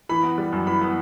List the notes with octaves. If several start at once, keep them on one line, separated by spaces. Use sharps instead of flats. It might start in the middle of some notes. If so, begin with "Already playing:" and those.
E3 B5
B3
G3
F#2
E3 B5
B3